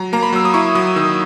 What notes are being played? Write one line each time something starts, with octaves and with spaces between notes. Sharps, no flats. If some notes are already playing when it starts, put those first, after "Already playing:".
Already playing: F#3 A#5
A#3 A#5
B5
F#3 E6
D#6
E4 C#6
F#3 D#6
D#3 E6